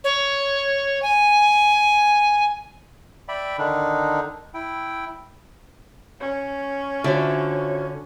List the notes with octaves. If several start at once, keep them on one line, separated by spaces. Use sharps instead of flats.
C#5
G#5
D5 E5 G5 B5
D3 D#3 D4 D#4
E4 G5
C#4
D3 F4 F#4 C5 C#5 E5